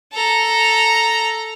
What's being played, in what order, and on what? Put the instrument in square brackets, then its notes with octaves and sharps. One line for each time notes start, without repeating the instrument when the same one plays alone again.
[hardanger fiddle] A4 A#5